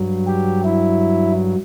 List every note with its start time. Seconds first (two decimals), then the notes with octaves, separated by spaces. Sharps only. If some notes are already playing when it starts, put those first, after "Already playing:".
Already playing: G2 F#3
0.27 G4
0.65 E4